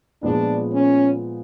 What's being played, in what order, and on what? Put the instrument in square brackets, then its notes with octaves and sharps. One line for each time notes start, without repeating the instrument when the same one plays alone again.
[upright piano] A#2 F3 G#3 B3 [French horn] D4
[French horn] C#4